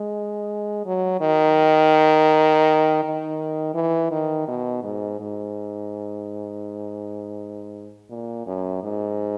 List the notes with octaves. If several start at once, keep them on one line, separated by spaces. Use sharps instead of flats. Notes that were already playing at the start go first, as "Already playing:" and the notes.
Already playing: G#3
F#3
D#3
D#3
E3
D#3
B2
G#2
G#2
A#2
F#2
G#2